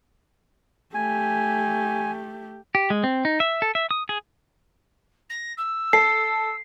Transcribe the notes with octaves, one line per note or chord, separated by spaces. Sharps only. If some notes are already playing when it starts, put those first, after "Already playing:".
A3 G4 G#5
G4
G#3
C4
D#4
E5
A4
E5
D#6
G#4
A#6
E6
A4 C7